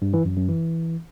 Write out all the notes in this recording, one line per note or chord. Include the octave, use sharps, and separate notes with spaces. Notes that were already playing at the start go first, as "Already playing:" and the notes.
G2
E3
F#2
F#2
E3